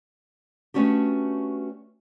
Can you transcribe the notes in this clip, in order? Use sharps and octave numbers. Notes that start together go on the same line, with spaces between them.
A3 B3 C#4 D4 F#4 G4